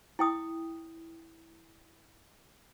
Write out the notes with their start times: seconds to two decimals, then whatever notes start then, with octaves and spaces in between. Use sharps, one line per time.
0.19 E4 G5 D#6